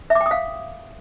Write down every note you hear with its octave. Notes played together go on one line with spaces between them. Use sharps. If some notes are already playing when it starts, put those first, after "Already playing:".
E5
D6
G5
D#6
F5